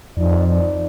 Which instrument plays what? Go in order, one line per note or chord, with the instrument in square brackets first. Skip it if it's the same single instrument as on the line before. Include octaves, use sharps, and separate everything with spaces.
[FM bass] F2 [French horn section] D#4 D5